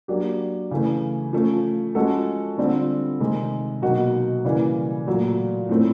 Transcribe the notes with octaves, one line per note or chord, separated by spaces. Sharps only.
F#3 A#3 D4 G4
C#3 E3 A3
F3 A3 C#4
F3 G#3 C#4 F#4 A4
D3 G3 C4 F4
C3 D#3 G#3
B2 F#3 A#3 D#4 F#4
C#3 E3 G3 A#3
A#2 F#3 A3
A2 F3 A3 C4